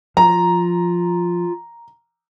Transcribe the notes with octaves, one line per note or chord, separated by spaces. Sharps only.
F3 F4 A#5